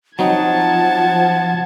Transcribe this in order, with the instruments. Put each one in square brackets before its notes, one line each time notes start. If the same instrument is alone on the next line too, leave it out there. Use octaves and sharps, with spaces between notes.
[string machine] F3 [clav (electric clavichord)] F#3 C4 D#4 [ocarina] F#5 [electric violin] A5 G#6